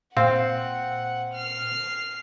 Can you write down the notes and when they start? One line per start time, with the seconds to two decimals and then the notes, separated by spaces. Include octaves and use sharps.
0.17 A#2 C4 F5 F#5
1.34 F6 C7